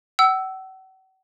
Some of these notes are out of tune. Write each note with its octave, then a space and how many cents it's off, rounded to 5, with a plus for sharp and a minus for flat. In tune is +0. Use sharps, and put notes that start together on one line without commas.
F#5 +40 E6 +0